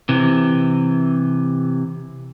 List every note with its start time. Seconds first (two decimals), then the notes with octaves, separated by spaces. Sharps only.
0.09 C3 E3